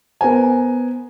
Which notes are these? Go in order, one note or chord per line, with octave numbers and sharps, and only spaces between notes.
B3 A#4 C5 G#5